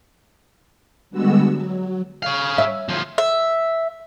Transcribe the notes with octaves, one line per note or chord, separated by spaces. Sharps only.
D3 G3 G#3 B3 F#4 E6
F#3
C#5 F5
E5
D2 F3
E5